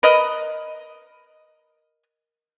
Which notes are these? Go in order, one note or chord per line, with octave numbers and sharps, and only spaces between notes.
A#4 B4 D#5